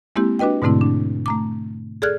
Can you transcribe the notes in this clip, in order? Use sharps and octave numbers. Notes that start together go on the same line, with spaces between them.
G#3 A#3 C4 E4 G4
D4 F#4 B4 D#5 G5
G#2 B2 D3 A3 C4 E4
D4
A3 A#5 D6
G#4 A4 D5 F6 F#6 G#6